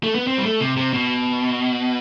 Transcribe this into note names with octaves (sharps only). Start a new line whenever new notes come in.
A3
B3
C4
G3
A3
C3
C3
B2